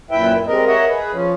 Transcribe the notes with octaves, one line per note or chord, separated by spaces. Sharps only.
F#2 A#2 E4 B4 E5 G5
G3 G#3 C4 A#4 D#5
A#4 C#5 D#5 E5 F#5
G#4 B4
F3 C#4